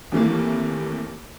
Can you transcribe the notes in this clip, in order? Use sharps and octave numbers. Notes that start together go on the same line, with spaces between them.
D#2 C3 E3 A3 A#3